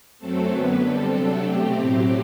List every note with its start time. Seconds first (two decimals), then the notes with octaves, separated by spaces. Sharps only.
0.19 F#2 F#3 A3 C4 A4
0.50 F#2 D3 F#3 B3 B4
0.81 D3 G3 C4 A4
1.13 C3 F#3 A3 D4 A4
1.45 B2 A3 C4 G4
1.77 A2 F#3 C4 G4